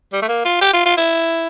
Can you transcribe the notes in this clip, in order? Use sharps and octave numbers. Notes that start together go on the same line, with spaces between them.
G3
A3
A#3
F4
G4
F4
F4
E4